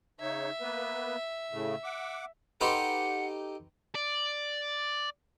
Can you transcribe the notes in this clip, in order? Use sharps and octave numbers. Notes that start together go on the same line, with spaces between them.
C#3 D#4 C#5 E5
A#3 B3 B4
A2 C#3 A3
F#5 D6
D#4 G4 A4 B4 F#5 B5 C6
D5